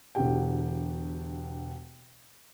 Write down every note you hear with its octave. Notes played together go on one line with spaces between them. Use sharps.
E1 B2 D3 E3 G4 G5